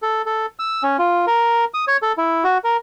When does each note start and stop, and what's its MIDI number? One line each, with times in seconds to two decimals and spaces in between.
0.02 0.22 69
0.26 0.46 69
0.59 0.83 88
0.83 0.97 61
0.99 1.26 65
1.27 1.65 70
1.74 1.85 87
1.87 1.97 73
2.02 2.12 69
2.18 2.44 64
2.44 2.58 66
2.64 2.77 70